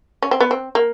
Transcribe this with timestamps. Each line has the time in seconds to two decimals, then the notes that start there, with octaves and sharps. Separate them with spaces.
0.22 C#4
0.31 C4
0.40 B3
0.51 C4
0.75 A#3